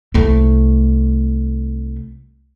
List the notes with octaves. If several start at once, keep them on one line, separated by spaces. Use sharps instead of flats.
C2 A3